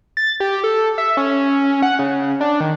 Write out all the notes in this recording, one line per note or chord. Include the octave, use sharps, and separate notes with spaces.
A6
G4
A4
E5
C#4
F#5
C#3
D4
D#3